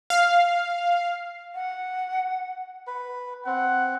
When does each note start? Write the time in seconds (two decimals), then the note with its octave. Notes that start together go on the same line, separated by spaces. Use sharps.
0.10 F5
1.55 F#5
2.87 B4
3.46 C4 F#5